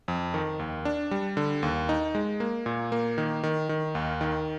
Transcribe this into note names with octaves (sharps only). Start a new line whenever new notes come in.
F2
D#3
D#2
D4
G3
D3
D#2
D#4
G#3
A#3
A#2
A#3
D#3
D#3
D#3
D#2
D#3